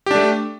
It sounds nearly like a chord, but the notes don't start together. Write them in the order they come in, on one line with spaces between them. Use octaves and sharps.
G4 D4 A3